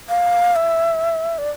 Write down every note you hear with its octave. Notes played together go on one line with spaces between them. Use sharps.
F5
E5
D5